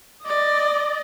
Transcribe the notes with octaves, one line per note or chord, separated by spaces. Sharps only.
D5 D#5